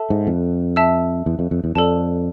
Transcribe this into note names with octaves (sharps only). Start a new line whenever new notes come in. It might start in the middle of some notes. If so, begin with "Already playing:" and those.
Already playing: A4 E5 A5
G#2
F2
E5 A5 E6
E2
F2
F2
E2
F2 A4 D5 A5